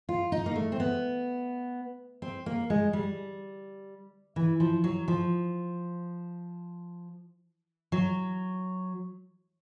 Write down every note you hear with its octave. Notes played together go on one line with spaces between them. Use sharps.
F4
D#4
A#3
A3
C4
B3
C4
A#3
G#3
G3
E3
F3
F#3
F3
F#3